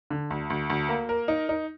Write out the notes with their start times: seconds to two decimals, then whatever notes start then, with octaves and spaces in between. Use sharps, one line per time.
0.10 D3
0.30 D2
0.50 D2
0.70 D2
0.89 A#3
1.09 A#4
1.28 D#4
1.49 D#4